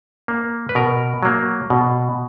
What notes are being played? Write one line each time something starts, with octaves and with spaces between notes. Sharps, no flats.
A#3
B4
B2 A#4
F#3 A#3
B2